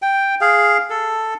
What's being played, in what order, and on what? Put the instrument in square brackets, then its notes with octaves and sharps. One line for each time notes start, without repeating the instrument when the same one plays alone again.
[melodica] G5
G#4 F5
A4